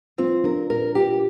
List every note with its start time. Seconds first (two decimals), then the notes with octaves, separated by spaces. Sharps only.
0.18 C4 F4
0.44 D4 A#4
0.70 A#2 A#4
0.95 F4 G4